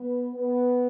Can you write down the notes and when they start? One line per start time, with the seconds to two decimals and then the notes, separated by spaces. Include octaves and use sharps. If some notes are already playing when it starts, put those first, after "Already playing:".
Already playing: B3 B4
0.34 B3 B4